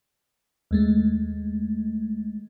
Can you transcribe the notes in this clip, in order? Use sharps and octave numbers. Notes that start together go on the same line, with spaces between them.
D#2 G#3 A3